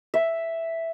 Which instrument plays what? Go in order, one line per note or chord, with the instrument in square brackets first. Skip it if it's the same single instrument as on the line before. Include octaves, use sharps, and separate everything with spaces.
[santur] E5